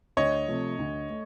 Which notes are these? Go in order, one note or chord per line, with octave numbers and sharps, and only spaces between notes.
D2 C#5 D#5
C3 F3 A3
D2
A3